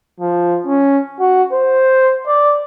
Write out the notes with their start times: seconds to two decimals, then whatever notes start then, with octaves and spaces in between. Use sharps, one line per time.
0.20 F3
0.66 C#4
1.20 F#4
1.53 C5
2.26 D5